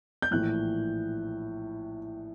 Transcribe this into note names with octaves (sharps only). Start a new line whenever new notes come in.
G6
A#1 A2 E3 F#6